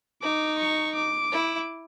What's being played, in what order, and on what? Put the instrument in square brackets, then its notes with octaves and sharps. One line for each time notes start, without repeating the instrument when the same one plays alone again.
[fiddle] D#4 [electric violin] D6
[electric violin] C#6
D6
[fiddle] E4